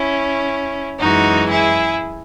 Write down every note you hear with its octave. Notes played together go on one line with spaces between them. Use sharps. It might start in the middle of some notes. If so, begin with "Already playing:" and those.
Already playing: C#4 E4
F#2 E3 G#3 D#4 F#4
E4 G#4